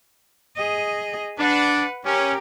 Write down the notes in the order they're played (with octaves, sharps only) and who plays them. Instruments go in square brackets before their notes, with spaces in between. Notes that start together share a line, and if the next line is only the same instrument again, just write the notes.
[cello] G#4 D#5
[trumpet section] D4 [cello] B4 F#5
[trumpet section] C#4 [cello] G4 A#4